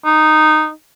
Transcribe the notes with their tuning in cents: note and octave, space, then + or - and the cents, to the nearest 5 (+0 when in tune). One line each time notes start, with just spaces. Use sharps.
D#4 -10